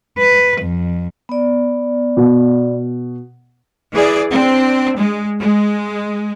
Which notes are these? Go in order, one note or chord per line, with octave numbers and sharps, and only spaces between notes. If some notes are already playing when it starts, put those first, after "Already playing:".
B4
F2
B3 D5
B2
E3 G#4 D5
C4 D4
G#3
G#3